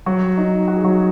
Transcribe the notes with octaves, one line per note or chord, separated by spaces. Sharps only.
F#3 F#4
D#4
F#4
G#4
F#3 F#4